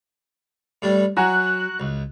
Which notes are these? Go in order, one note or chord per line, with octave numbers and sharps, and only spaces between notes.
A2 G3 D4
F#3 F#4 G#5 A#5 F#6
C#2